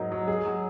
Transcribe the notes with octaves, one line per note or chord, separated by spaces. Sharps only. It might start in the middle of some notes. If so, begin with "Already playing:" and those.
Already playing: G#2 F#3 D#4 A#4
F#3
G#4
F#3